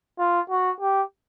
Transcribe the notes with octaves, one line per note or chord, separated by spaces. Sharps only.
F4
F#4
G4